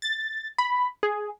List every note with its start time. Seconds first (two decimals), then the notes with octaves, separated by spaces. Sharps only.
0.02 A6
0.58 B5
1.03 G#4